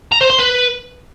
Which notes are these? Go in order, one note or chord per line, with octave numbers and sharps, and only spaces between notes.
A#5
C5
C6
B4